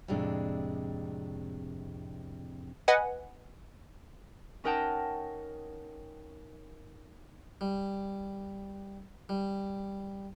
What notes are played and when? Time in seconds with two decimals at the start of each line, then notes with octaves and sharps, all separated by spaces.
0.08 F2 A2 C3 G#3 D4
2.88 B4 D#5 F#5 G#5
4.64 C#4 D#4 A#4 F#5 G5 A5
7.61 G3
9.29 G3